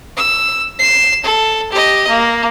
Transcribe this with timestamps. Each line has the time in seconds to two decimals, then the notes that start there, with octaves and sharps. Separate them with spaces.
0.17 E6
0.79 C7 E7
1.24 A4
1.72 G4 D#5
2.08 A#3